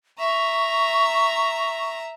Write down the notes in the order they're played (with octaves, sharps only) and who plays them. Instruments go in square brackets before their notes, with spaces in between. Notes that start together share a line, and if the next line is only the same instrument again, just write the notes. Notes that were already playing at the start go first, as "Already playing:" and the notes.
[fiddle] E5 A#5 [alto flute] C#6